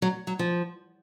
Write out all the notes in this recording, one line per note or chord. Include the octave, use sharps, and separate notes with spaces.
F#3
F#3
F3